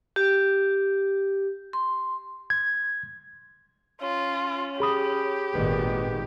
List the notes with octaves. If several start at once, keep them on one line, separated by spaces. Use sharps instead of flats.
G4
C6
G#6
C#4 F4
G4 G#4 B5 D#6
G#1 A#2 D#3 B3